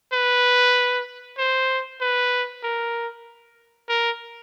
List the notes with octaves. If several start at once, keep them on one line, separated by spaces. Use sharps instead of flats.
B4
C5
B4
A#4
A#4